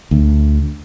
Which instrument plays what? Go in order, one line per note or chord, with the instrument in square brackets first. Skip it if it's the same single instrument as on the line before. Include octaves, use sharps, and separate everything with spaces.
[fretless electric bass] D2